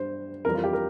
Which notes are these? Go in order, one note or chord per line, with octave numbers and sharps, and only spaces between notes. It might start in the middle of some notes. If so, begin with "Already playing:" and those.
Already playing: G2 G3 C5
F2 E3 G3 A#4
F4
G4
A#4